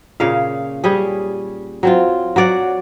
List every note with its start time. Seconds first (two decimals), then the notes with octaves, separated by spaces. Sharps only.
0.20 A#2 C#3 C#5 F5
0.84 G3 C#4 G#4
1.83 F#3 C4 F4
2.36 F#3 F#4 D5 F#5